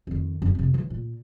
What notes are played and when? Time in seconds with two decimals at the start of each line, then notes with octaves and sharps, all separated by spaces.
0.07 F2 D#3
0.42 F#2 B3
0.55 F2 C3
0.74 E3 F#3
0.90 A#2